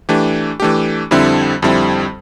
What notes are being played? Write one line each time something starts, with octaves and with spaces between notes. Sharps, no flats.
E3 A3 D4 G4
E3 A3 D4 G4
F2 D3 G3 C4 E4
F2 D3 G3 C4 E4